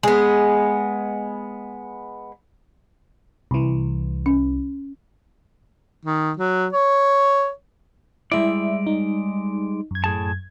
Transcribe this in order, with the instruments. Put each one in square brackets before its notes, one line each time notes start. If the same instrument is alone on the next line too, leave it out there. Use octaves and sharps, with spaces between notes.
[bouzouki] G#3 B3
[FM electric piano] C2 E3
[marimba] C#4
[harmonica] D#3
F#3
C#5
[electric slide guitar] G3 G#3 D5 [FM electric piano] E4 E5
[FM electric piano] D#4
F#2 G#6
[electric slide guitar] A2 G#4 A5